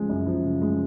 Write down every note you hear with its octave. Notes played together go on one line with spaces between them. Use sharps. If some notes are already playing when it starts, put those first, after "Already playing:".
Already playing: C#3 F3 G#3
F#2
F3
C#3
G#3